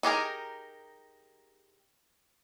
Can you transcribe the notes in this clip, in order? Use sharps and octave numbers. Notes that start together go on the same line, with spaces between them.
D#4 G4 G#4 A#4